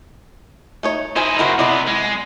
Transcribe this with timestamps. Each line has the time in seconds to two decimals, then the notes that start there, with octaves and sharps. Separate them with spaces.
0.83 A3 D#4 C#5
1.16 D#4 E4 C5 G#5
1.39 C#3 E4 F#4 A#4 C5
1.59 C3 B3 E4 D5 D#5
1.87 G#3